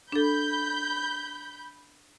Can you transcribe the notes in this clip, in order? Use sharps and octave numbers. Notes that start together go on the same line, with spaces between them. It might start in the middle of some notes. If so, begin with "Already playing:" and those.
D4 A4 B5 G6